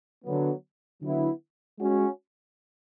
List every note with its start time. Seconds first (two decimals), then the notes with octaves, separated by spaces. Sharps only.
0.24 D3 F#3 B3
1.02 D3 F#3 B3 E4
1.79 G#3 C#4 F#4